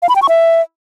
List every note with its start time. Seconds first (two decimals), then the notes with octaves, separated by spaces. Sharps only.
0.02 F5
0.09 B5
0.16 G5
0.22 C#6
0.29 E5